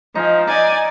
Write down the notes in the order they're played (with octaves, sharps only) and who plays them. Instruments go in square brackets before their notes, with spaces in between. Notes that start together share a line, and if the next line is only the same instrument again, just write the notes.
[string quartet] F3 [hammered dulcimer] D#4 G#5
[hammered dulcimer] D#4 [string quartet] D5 G#5